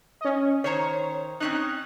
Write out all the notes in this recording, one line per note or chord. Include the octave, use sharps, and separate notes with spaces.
C#4 D#5
D#3 C5 C#5 A#5
C4 C#4 D#4 F#6